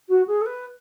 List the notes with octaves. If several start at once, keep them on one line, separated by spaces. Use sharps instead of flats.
F#4
G#4
A4
B4